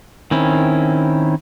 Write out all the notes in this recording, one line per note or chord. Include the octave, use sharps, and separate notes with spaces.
D#3 C4 C#4 E4